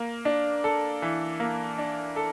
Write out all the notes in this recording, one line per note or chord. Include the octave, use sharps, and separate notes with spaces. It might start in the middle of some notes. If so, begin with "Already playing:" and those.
Already playing: A#3
D4
A4
E3
A#3
D4
A4